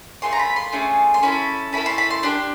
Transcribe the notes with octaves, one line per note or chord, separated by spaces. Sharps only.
A3 C#4 F4 G#4 C6
A#5
B5
C6
A3 C#4 F4 G#4
C6
C#4 E4 A4 B5
C#4 E4 A4 B5
C6
B5
C6
D4 G4 C6